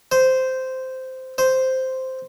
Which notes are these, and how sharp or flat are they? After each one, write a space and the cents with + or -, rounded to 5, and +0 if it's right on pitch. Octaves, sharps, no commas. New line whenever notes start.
C5 -10
C5 -5